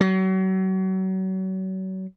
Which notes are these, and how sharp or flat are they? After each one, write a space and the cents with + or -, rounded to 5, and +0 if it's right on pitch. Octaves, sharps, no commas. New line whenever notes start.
F#3 +35